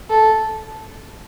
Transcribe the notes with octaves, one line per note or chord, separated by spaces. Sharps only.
A4